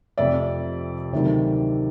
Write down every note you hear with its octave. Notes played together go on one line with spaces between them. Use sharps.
F1 F2 C3 D5 E5
D2 C3 D#3 F#3